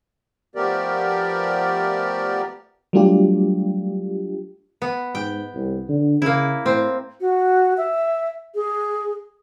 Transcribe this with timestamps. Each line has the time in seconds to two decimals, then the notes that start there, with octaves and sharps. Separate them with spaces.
0.55 F3 A3 B3 G4 A#4 D5
2.93 F#3 G3 A3 D4 F4 G4
4.82 B3
5.15 G#2 G5
5.54 C2
5.89 D3
6.22 C#3 A#3 E4
6.66 A2 C4
7.21 F#4
7.77 E5
8.55 G#4